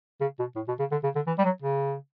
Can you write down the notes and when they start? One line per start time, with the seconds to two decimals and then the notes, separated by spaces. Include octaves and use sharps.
0.21 C#3
0.39 B2
0.56 A2
0.68 B2
0.79 C#3
0.91 D3
1.03 C#3
1.15 D3
1.27 E3
1.39 G3
1.45 F#3
1.62 C#3